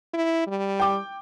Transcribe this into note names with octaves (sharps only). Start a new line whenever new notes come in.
E4
G3
G5 D6